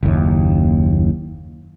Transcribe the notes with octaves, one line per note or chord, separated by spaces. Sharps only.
F#1 D#2